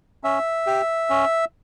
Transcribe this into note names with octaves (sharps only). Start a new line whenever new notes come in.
C#4 E5
G4
C#4